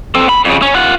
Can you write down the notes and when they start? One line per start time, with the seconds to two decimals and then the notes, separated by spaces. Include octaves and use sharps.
0.15 C4 A4
0.29 B5
0.45 F2 C#3
0.62 C#4
0.75 F4 F#5